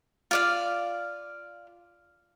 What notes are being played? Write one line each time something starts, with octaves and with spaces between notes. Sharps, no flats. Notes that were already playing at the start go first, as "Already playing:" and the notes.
F4 D5 F5